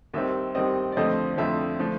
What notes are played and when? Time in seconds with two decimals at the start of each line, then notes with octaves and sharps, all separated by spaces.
0.14 D#2 D#3 G3 C4 E5
0.55 D#2 D#3 G3 C4 D#5
0.92 D5
0.96 F2 D3 F3 A3 C4 D#5
1.37 F2 D3 F3 A3 C4 E5
1.79 D3 F3 A3